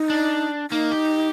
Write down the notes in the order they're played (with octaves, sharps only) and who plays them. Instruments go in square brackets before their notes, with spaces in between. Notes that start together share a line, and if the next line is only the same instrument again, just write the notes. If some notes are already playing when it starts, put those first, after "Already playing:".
Already playing: [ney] D#4
[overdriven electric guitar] D4
[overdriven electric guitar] A#3 [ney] D#4
[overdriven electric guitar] G4